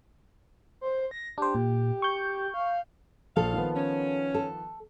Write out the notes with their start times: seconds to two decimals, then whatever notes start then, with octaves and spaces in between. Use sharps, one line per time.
0.81 C5
1.11 A#6
1.38 D4 G4 C5
1.55 A#2
2.02 C#6 G6
2.54 F5
3.37 A#1 A4 F5
3.53 D#3 F3 B3
3.75 C#4
4.34 A4